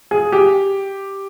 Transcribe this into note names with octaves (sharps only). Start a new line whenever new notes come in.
G#4
G4